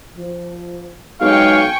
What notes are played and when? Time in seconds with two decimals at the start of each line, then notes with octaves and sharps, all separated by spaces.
0.17 F3
1.21 B1 G#3 F5 G5 G#5 C#6